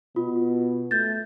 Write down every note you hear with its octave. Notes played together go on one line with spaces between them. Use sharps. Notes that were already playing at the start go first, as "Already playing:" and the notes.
B2 F4
A3 G6 A6